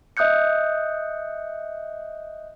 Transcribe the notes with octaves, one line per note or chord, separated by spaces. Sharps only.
D#5 E5 D#6 F#6 G6 C#7